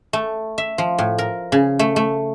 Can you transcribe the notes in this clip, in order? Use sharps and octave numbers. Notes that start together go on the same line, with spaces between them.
A3
E5
F3
A2
A#4
C#3
A3
A3